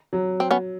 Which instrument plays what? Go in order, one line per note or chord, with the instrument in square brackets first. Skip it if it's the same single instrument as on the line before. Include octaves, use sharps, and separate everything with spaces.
[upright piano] F#3
[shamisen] C4
B3 C#4